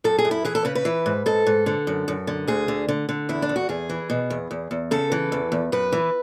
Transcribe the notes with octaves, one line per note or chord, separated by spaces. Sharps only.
F#2 A4
G#4
F#2
E4
E3 G#4
A4
C#3 B4
B4
E3
G#2
G#2 A4
G#2
D3
F#2
F#2
D3
D2 G#4
D3
D3
D3
E2 E4
D4
E2
F#4
E2 G#4
E3
B2
E2
E2
E2
C#3 A4
E3
E2
E2
F#2 B4
E3